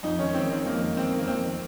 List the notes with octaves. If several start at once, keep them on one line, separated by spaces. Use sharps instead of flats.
F2 D#4
D#3 C#4
D#3 C4
D#3 C4
F2 A#3
D#3
D#3 C4
D#3
A#3
F2 C4
D#3